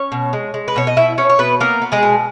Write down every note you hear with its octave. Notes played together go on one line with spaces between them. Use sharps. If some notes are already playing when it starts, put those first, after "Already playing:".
Already playing: C#4 C#5
B2
G#3
G#3
B4
B2 C#5
D#5
B2 E4 E5
B2 C#4 C#5
C#5
B2 B3 B4
A#3 B3 A#4
B3
G#3 G#4
B2